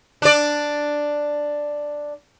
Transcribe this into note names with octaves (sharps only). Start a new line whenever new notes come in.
D4 D5